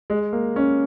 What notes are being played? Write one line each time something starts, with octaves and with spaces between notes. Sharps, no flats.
G#3
A#3
C#4